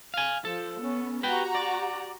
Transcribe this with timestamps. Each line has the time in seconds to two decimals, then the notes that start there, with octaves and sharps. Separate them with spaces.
0.14 F5 G#5
0.45 F3 A4
0.79 B3 C#4
1.23 F#4 G4 B4 G5 A#5
1.55 D5